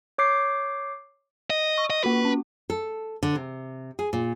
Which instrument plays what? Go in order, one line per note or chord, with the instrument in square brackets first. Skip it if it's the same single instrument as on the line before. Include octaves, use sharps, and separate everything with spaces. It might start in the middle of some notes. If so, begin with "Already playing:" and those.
[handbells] C#5 D6 G6 C7
[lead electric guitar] D#5
[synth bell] C#6
[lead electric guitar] D#5
[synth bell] A#3 F4 F#4 [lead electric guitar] B4
[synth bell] C#4
[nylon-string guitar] A4
D3
C3
G#4
A#2